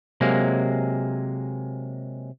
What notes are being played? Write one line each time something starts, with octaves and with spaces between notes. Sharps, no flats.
C3 F#3 G#3 A#3